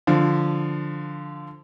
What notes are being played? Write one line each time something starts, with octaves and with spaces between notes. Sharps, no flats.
D3 F3